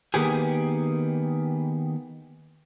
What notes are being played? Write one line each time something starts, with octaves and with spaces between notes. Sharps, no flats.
D#3 A#3 B3 G4 G#4